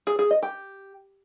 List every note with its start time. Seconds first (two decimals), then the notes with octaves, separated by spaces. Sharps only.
0.07 G#4
0.19 G#4
0.31 D#5
0.43 G4